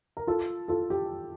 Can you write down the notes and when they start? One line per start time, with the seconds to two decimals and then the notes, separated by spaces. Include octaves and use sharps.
0.17 A#4
0.27 F4 A4
0.68 F4 A4
0.90 G4